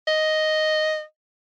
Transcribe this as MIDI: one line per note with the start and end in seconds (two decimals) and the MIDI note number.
0.07 1.02 75